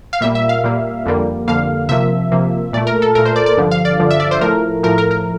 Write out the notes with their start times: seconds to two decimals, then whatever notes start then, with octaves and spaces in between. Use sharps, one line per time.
0.13 F5
0.21 A#2 G3 A#3 E5
0.35 E5
0.49 F5
0.64 A#2 G3 A#3
1.06 F2 D3 G3 A#3
1.48 F2 D3 G3 A#3 F5
1.89 C3 F3 A#3 E5
2.32 C3 F3 A#3
2.73 A#2 D5
2.77 A3
2.87 A#4
3.02 A4
3.15 A#2 A3 A#4
3.25 C5
3.36 D5
3.46 D5
3.57 G2 D3 F3
3.71 F5
3.85 D5
4.00 G2 D3 F3
4.11 E5
4.20 D5
4.31 C5
4.41 A2 F3 A3 A#4
4.83 A2 F3 A3 A#4
4.98 A#4
5.11 A#4